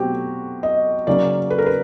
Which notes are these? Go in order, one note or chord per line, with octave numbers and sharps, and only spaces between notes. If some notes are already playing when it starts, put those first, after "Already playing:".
Already playing: B2 F#3 A3 C4 F#4 G4
D#5
C#3 F#3 A#3 C#4 D5
B4
A#4
B4